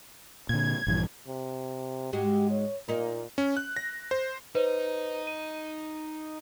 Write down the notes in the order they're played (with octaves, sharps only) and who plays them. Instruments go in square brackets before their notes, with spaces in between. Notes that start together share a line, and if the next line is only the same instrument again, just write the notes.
[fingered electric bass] A#2 D3 [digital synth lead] G#6
[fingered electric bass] A#1 G2 E3
[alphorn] C3
[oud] G#2 G#3 F#4 [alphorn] G4
[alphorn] C#5
[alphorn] A#2 [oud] A#3 D#4
[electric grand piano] C#4
F#6
A#6
C5
[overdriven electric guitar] D#4 [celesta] B4 C5
[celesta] D#7